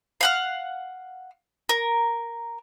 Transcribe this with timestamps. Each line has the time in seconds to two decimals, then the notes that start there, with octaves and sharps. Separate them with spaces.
0.21 F5 F#5 F6
1.69 A#4